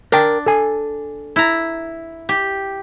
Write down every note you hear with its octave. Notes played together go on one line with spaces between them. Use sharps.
D4 A#4 G5
A4 G#5
E4 A#5
G4